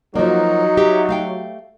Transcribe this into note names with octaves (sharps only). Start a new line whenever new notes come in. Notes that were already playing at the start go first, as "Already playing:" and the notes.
F3 F#3 A#3 D#4
G4 E5
A3 F5 G5